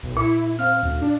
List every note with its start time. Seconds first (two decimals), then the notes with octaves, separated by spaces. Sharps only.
0.03 B1
0.17 A#2 E4
0.59 C4 F5 F6
0.83 D2
1.02 D4